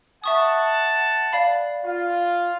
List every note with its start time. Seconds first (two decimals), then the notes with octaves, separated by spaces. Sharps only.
0.24 E5 F#5 A5 C#6 D#6
1.33 D5 F5 B5
1.84 F4